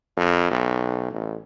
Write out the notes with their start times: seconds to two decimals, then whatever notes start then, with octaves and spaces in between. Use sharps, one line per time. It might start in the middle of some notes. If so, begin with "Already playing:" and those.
0.17 F2
0.51 B1
1.11 A1